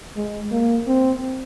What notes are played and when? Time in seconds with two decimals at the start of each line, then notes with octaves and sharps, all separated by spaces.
0.16 G#3
0.51 A#3
0.87 C4